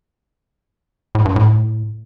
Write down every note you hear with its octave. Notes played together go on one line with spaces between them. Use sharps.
A2
G2
A2